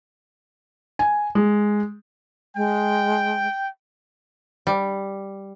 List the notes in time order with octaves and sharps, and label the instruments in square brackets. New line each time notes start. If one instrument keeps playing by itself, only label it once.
[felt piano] G#5
G#3
[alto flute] G#3 [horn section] G5
[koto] G3